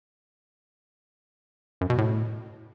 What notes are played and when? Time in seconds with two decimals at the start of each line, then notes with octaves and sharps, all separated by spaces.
1.81 F#2
1.90 B2
1.98 A2